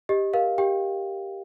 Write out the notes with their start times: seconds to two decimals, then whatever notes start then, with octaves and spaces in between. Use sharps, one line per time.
0.09 G4 D#5
0.34 A#4 F5
0.58 G4 G5